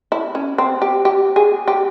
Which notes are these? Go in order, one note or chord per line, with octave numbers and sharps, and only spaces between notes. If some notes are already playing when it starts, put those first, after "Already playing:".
E4
C#4
C4
G4
G4
G#4
G4